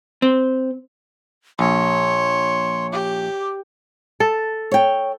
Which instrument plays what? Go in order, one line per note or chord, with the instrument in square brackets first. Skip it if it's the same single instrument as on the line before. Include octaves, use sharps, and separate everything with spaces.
[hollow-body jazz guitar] C4
[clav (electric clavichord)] A#1 [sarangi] C#5 [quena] C6
[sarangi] G4 [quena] D6
[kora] A4
[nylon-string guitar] C#5 G5